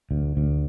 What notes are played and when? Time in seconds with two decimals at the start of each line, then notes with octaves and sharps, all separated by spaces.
0.11 D2
0.37 D2